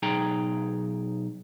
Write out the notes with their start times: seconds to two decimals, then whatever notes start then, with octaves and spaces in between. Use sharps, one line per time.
0.03 B1 D#4 G#4 G5 A#5